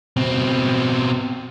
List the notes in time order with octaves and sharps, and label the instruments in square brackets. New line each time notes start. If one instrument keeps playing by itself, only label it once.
[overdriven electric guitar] B2 C4